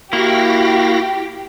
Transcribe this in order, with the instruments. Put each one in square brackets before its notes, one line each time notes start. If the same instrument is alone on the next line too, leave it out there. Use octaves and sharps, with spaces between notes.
[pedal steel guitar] A#3 [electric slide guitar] E4 [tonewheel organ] F#4 F5 A#6 [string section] G4